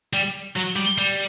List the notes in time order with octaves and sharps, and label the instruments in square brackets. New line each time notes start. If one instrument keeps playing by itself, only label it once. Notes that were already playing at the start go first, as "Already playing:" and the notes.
[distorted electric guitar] G3
F#3
G3
G3